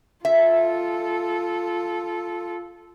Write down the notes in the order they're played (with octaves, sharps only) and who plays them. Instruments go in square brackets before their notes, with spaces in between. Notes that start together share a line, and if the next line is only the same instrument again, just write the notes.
[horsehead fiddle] F4 A4 [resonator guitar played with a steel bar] E5